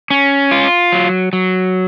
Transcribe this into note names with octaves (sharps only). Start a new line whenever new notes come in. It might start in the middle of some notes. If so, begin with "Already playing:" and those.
C#4
F4
F#3
F#3